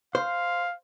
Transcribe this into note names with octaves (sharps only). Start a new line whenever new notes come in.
C5 F5